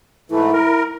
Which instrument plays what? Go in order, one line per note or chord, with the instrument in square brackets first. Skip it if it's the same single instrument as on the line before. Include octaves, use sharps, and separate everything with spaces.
[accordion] G#2 E3 A3 [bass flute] E4
[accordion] A#4